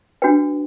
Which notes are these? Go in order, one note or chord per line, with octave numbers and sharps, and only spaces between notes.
D4 F#4 B4 G5